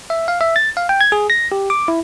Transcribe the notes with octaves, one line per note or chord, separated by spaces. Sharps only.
E5
F5
E5
A6
F5
G5
G#6
G#4
A#6
G4
D6
E4